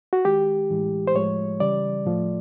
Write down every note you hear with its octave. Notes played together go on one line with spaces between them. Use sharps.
F#4
D#3 G#3 G4
A2 E3 G#3
C5
A2 F3 G#3 C#5
C#3 E3 G3 D5
A2 F3 A3